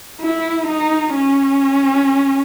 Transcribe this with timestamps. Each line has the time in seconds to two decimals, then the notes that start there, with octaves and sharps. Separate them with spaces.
0.20 E4
0.67 D#4
1.15 C#4